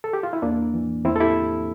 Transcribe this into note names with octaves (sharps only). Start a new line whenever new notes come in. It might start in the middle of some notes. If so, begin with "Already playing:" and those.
A4
G4
F4
E4
E2 A#3 D4
E3
E2 C4 E4
A4
E4 G4